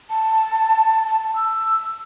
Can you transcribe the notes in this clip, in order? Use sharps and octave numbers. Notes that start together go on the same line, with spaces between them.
A5
A5
E6